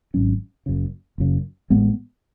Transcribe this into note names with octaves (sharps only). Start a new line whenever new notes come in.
G#1 G#2 F#3 C#4
F#1 F#2 C#3
F#1 F#2 C#3
A1 A2 G#3 B3